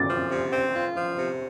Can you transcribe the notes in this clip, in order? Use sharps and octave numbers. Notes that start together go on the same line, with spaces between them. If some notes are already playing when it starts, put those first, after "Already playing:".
Already playing: D6 A6
F3
C3
C4
F4
F3
C3